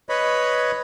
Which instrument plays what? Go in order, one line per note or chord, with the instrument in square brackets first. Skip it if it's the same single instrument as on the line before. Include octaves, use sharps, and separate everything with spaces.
[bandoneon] B4 C#5 D#5 B5